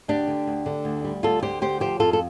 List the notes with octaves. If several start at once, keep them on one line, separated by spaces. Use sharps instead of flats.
D2 D4 G4
D3
D2
D3
D2
G3
D2 F4 A4
D3 G4 C5
D2 G4 C5
F3 G4 C5
F2 F4 A4
A4